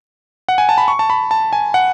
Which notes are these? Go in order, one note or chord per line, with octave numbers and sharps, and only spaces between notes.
F#5
G#5
A5
B5
C#6
A5
B5
A5
G#5
F#5